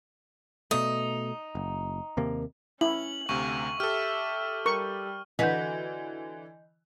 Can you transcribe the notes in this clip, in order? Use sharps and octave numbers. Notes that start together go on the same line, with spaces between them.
B2 A3 D#4
F#1
D#2 C3 A#3
C#4 E4 F#7
D2 C3 F5 C#6
G4 A4 E5 F6
G3 A#4 C#6
D3 E3 F#4 B4 D#5 G6